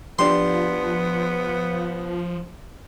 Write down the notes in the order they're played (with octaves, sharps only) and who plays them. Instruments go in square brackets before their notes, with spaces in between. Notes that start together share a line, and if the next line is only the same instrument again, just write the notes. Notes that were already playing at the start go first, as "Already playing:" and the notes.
[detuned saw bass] F3 [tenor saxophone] B3 [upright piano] D4 G4 [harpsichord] C6